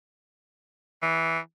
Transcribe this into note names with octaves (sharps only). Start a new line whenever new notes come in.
E3